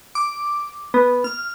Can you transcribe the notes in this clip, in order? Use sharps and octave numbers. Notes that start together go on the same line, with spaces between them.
D6
B3
F6